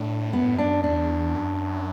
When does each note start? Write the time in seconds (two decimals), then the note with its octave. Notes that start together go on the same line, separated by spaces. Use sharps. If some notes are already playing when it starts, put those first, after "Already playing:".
Already playing: A2 D4
0.33 F#2 B3
0.44 A2
0.55 F#2 D4
0.83 E2 D4
1.34 F#2